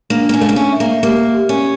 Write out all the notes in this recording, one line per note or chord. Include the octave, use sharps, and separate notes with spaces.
A#3 D4
A#3
C#4
A3 A#4
A#3
C#4
E5
A#3
A#3 G4
G4
C#4